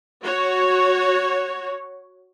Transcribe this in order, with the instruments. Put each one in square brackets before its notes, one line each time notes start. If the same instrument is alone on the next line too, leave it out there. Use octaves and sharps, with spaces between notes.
[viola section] F#4 C#5